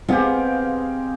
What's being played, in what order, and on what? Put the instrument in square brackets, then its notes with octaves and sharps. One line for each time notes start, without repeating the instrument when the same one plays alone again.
[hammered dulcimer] G#3 G4 [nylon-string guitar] B3 [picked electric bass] C4 [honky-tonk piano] F5